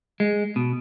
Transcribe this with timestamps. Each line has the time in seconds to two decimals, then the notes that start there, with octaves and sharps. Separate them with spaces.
0.20 G#3
0.56 B2